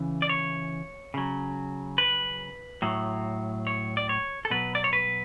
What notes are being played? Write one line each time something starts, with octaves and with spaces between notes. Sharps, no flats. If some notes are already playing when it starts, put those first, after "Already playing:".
Already playing: C#3 E3
D5
C#5
C#3 F#3
B4
A2 F#3
C#5
D5
C#5
A4
B2 F#3 B4
D5
C#5
B4